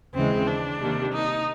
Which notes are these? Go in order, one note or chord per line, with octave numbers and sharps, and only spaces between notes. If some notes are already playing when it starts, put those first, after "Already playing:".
D#2 C#3 E3 G#3 C4
D4
C3 D#3 G3 A#3
D#4